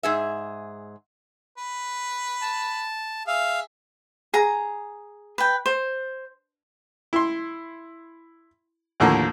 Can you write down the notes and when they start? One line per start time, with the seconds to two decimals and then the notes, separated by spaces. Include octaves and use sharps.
0.03 G#2 G#4 E5
1.58 B4
2.42 A5
3.27 G#4 E5 F5
4.34 G#4 A#5
5.38 B4 G5
5.66 C5
7.13 E4 C6
9.00 D#2 A2 D3 F3 A#3